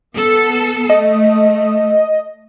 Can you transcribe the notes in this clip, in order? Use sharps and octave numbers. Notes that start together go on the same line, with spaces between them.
B3 A4
A3 D#5